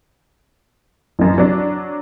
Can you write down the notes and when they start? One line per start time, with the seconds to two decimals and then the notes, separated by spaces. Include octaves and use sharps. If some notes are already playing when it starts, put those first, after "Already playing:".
1.19 A1 F#2
1.38 F#3 D4